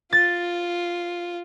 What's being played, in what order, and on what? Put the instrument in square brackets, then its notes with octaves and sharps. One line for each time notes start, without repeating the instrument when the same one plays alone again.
[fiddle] F4 [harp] A6